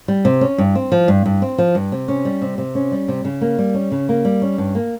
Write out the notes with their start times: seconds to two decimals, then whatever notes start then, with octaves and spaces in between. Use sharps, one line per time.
0.08 G3
0.25 C3
0.41 C#4
0.58 G2
0.75 C4
0.92 F3
1.08 G2
1.26 G2
1.42 C4
1.58 F3
1.75 G2
1.92 C3
2.08 C#4
2.25 G3
2.42 C3
2.58 C3
2.75 C#4
2.92 G3
3.08 C3
3.25 C#3
3.41 A#3
3.58 G3
3.74 C#4
3.92 C#3
4.09 A#3
4.25 G3
4.42 C#4
4.58 G2
4.75 A#3